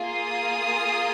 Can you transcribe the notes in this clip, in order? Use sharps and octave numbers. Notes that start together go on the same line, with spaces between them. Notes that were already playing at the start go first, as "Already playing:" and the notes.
Already playing: A#3 F4 G#4
D#6